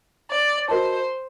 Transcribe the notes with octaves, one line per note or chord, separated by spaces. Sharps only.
D5
F#4 A#4 C5 D#5 A5